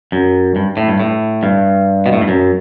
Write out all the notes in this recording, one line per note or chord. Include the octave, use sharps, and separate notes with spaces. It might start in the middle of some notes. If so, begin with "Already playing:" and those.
F#2
G2
A2
G2
A2
G2
B2
A2
G2
F#2